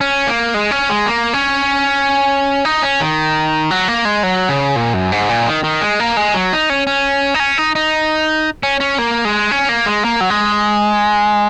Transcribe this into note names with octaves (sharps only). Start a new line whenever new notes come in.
C#4
A#3
G#3
C#4
G#3
A#3
C#4
D#4
C#4
D#3
F#3
A#3
G#3
F#3
C#3
A#2
F#2
G#2
A#2
D#3
D#3
G#3
A#3
G#3
F#3
D#4
C#4
C#4
D#4
C#4
D#4
D#4
C#4
C#4
A#3
G#3
C#4
A#3
G#3
A#3
F#3
G#3